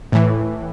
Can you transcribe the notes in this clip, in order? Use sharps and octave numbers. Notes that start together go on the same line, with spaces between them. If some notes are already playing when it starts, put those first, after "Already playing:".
A2 E3